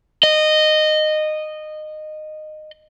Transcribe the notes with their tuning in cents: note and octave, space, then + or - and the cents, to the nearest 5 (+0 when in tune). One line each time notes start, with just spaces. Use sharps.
D#5 -15